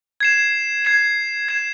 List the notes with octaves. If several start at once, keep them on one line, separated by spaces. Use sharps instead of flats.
G#6 C7 E7
G#6 C7 E7
G#6 C7 E7